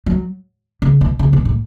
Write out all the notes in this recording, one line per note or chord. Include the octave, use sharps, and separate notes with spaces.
F#3
C#3
B2
C#3
B2
A2